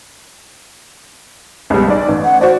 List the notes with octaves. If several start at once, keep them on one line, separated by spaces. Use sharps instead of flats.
C#2 B2 G3
B1 D5
A1
F#5
F#4 C5 D5